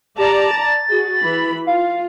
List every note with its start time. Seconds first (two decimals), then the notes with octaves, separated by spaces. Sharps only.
0.18 G4 D5 A5 A#5
0.51 A6
0.89 F#4 G#4
1.19 E3 B5
1.67 F4 F5